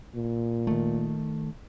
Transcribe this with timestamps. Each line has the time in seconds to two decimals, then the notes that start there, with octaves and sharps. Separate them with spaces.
0.16 A#2
0.67 D#3 A3